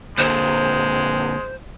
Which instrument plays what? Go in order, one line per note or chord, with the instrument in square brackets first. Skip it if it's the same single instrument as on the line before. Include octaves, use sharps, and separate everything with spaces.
[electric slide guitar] A#2 D3 A#3 [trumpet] G#3 [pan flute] C5